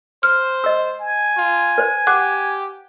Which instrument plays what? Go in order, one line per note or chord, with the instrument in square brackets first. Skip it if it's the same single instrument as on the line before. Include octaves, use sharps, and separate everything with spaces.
[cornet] C5 [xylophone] F6
[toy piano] D#5 E6
[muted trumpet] G#5
[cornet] F4
[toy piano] B4 C5
[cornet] G4 [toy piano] F#5 D6 [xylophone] F#6